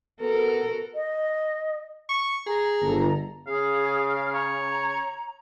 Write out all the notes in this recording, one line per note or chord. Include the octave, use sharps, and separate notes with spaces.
B3 F#4 A4 A#4
D#5
C#6
G#4 A#5
G1 A4
C#3 G#4 F5
C#5 A#5